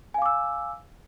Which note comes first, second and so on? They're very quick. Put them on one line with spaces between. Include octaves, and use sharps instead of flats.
G#5 F5 D6 E6